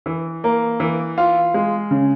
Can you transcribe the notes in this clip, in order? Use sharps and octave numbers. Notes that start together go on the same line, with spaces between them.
E3
A#3
E3
F4
G#3
C#3